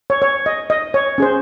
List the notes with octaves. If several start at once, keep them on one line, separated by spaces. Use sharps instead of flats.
C#5
C#5
D#5
D#5
C#5
C#4 G#4 C5